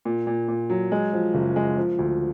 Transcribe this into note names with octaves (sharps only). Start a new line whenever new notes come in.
A#2
A#2
A#2
F#3
G#3
F3
F#1
G#3
F3
D2